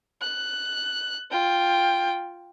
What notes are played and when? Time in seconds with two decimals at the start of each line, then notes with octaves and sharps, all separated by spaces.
0.21 F#6
1.31 F4 G5